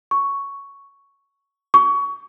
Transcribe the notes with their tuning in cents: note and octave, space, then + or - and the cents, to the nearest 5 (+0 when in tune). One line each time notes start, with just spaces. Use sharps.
C#6 +5
C#6 +25